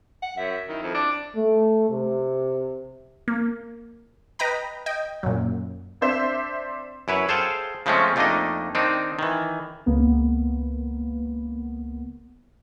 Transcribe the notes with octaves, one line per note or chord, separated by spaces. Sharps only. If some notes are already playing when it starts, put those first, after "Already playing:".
F#5
F#2 E5
D#3 E4
F2
D4
A3
C3
A#3
B4 D#5 G5 A#5 B5
D#5 G5
F#2 A#2
C4 D4 C5 E5
F#2 E4 B4 C#5
G#4 A4 C5 F5 G5
C#3 F3 G#3 A3 C4 C#4
F2 A3 A#3 D4 D#4 D#5
D#3 C4 D4 D#4
D#3 E3
C#2 A#3 B3